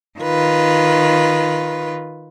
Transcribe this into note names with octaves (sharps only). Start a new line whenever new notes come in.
D#3 F4 B4